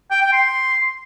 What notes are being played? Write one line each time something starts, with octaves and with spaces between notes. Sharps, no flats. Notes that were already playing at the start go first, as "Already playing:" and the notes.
G5
G5
C6